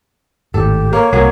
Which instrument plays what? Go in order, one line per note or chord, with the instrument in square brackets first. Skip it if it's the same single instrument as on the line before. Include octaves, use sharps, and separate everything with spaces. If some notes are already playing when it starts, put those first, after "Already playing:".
[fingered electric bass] G#1 A2 [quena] G4 [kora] A4
[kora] A#3 [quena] C#5
[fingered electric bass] C2 [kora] F#3 A#3 G#4